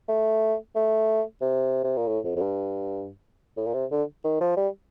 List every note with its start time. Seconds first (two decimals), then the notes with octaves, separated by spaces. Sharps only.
0.08 A3
0.76 A3
1.41 C3
1.84 C3
1.97 A#2
2.08 A2
2.24 F2
2.36 F2
2.42 G2
3.57 A2
3.66 A#2
3.74 C3
3.91 D3
4.24 D#3
4.41 F3
4.57 G3